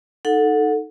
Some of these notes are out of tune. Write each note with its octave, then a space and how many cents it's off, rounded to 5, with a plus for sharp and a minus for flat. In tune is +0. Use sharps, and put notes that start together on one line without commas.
D#4 +0 A4 +0 F#5 -20